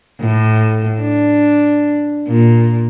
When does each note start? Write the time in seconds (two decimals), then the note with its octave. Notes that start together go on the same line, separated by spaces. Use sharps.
0.20 A2
1.00 D4
2.27 A#2